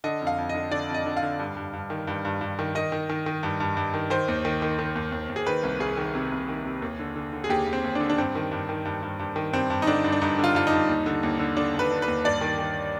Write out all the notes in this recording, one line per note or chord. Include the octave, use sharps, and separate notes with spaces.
D3 D#5
F2
F5
F2
D#5
D3
D3 D5
F2
D#5
D3
F5
D3
G2
G2
G2
D#3
G2
G2
G2
D#3
D#3 D#5
D#3
D#3
D#3
G2
G2
G2
D#3
D#3 C5
D#2
D#3
D#3
D#3
D#2
D#2
D#2
G#4
D#3 B4
C2
C2 G#4
D#3
C3
C2
D#3
C3
D#2
D3
D3
D3
G#4
D#2 G4
D#2
C4
D#2
D3 D4
D4
G2 C4
D#3
G2
D#3
G2
G2
G2
D#3
G2 C4
G2
D#4
D3 D4
G2
D4
G2 D#4
D3
F4
G2 F4
D#4
G2
D#2
D3
D#2
D3
D3 D4
D#2
B4
D3
B4
D#2
G2 D5
D#3
D#3